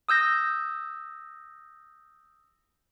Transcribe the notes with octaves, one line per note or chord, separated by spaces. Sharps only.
D#6 E6 G6 A#6